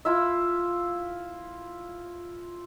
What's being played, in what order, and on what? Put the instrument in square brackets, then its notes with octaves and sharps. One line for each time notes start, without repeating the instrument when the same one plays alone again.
[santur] E4 F4 E5